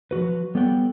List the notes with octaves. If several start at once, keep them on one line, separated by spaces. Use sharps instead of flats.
F3 F#3 F#4 B4
G3 B3 A4 C#5 F#5 G5